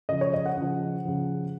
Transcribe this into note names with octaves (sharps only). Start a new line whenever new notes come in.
C#3 F3 D#5
C#5
D#5
F#5
C#3 F3
C#3 F3